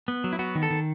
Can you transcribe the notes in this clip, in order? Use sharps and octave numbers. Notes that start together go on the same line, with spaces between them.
B3
F#3
E4
B3 F#4
D#3
A4
D#3